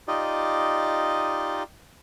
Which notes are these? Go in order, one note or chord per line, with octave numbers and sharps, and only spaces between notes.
D#4 F4 G4 D5 D#5